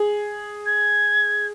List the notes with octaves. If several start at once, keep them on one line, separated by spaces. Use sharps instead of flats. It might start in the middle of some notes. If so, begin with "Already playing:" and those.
Already playing: G#4
G#6